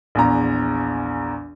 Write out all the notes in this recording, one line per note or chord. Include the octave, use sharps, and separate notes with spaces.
A#1 E2 A#5